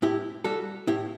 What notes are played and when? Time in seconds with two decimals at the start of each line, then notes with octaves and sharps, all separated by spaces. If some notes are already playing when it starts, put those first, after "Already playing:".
0.02 A2 E4 G4
0.44 G3 F#4 A4
0.87 A2 E4 G4